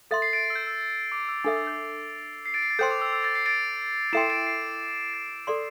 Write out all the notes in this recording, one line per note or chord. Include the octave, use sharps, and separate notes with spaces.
A4 E5 C6 A6
C7
A6 D7
C7
E6
G6
E6
D6
E6
D4 A4 E5 D6
E6
G6
C7
A6 D7
C7
A6
A4 C5 G5 C6 G6
D6
E6
E6
A6
C7
A6 D7
E4 A4 E5 G5 C6 C7 E7
A6 D7
C7
A6
A4 D5 C6